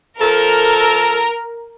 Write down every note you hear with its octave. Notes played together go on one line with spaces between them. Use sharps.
F3 A4 A#4